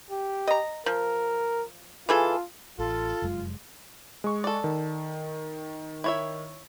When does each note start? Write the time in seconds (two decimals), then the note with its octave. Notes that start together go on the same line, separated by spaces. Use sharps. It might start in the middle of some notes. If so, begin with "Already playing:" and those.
0.11 G4
0.47 D#5 A#5
0.86 F3 A#4
2.09 E3 F4 G#4 A4
2.78 A1 F4 A4
3.22 F1 F#2 G#3
4.24 G#3 C#6
4.44 A4 D5
4.64 D#3
6.04 E4 C#5 E5